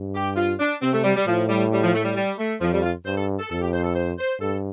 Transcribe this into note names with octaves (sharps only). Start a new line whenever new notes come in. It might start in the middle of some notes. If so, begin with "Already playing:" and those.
Already playing: G2
G4
F4
D4
C3 C4
A3
G3
G3
A2 F3
G3
G3
F3
A3
G3
G3
A3
F2 F3
G3
F4
G2 C5
A4
A4
F2 A4
G4
C5
A4
C5
C5
G2 A4